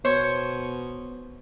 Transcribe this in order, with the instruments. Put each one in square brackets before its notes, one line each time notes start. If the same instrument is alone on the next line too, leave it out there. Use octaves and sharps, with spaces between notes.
[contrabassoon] B2 [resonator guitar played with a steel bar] C5 C#5